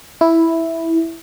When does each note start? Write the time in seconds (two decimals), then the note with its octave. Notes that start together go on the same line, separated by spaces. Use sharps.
0.21 E4